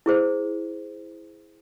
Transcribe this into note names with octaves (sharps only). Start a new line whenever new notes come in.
E4 G#4 C5